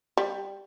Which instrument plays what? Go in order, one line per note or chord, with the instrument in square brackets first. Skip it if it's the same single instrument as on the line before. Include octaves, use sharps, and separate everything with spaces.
[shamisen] G3